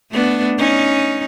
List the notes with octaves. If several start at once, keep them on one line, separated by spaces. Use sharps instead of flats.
A3 B3 D4
C#4 D#4